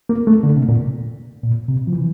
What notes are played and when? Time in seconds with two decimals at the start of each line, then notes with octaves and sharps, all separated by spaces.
0.09 A#3
0.27 A3
0.43 D3
0.56 C3
0.69 A#2
1.43 A#2
1.69 C3
1.87 F3
1.93 E3